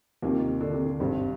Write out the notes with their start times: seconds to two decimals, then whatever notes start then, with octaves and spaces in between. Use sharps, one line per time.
0.22 D#2 C3 D#3 A#3 F4
0.61 D3
0.73 C3
0.86 D3
1.00 G#1 G2 C3 D#3 G3 C4